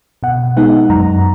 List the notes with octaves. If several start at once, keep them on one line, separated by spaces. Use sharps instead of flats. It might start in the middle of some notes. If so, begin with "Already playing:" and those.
B2 F#5
G#3 B3 D#4 F#5
F#2 A#5